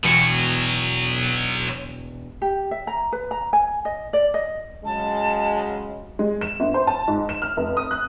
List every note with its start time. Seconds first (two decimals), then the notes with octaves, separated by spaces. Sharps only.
0.04 E1 B2 F#3 C#7
2.42 G4
2.71 E5
2.87 A#5
3.12 B4
3.31 A#5
3.53 G#5
3.85 D#5
4.13 D5
4.34 D#5
4.85 C#3 F#3 G#3 A5
6.19 G#3
6.41 E7
6.60 G1
6.74 C5
6.87 A5
7.08 G#2
7.29 E7
7.42 F6
7.57 F1
7.77 D#6
7.91 F#6